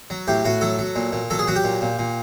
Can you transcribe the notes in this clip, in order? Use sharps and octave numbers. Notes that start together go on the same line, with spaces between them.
F#3
A2 G4
A2 F#4
F#3 A4
F#3
A#2
A#2
F#3 A4
G#4
F#3 F#4
G4
A#2
A#2
A#2